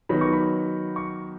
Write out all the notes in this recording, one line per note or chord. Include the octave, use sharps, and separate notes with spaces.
D#3 F#3 B3 D#4 B5
C#6
B5
C#6